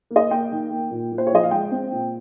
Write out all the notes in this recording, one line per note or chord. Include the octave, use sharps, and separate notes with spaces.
A#3
D#5
A#3 G5
D#3
A#3
A#2
A#2
C5
C#5
F3 D#5
F5
G#3 G5
C4
A#2